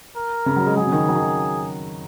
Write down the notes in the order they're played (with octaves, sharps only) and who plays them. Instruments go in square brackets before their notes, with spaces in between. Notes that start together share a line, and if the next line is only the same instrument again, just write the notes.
[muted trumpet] A#4
[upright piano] C#3
F#3
G#3
[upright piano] F#3 [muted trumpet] G#4
[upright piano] C#3
D#3
F#3
D#3